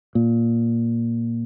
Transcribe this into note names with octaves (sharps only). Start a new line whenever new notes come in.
A#2